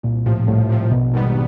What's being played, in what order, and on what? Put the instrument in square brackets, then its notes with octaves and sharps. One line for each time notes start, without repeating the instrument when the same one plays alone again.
[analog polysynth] C2 [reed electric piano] A#2
[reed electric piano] A2 [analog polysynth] C3 F3
[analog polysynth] C2 [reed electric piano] A2
[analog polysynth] C3 F3
[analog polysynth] A#1 [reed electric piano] B2
[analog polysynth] G#2 D#3 G3 B3